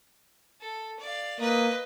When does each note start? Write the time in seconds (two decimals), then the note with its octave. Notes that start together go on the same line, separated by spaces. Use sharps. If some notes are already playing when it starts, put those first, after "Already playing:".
0.61 A4
1.00 D5 F5
1.40 A#3 B4 D#5